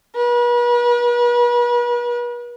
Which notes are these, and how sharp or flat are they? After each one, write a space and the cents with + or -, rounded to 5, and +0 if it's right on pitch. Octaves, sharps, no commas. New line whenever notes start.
B4 -40